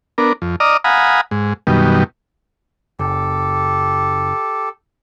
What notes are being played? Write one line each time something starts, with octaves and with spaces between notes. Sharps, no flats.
B3 D4 A#4
F2
D5 D#5 A#5 D#6 F6
F5 F#5 G#5 A#5 B5 D#6
G#2
F#2 B2 D#3 G3
F#1 G4 A4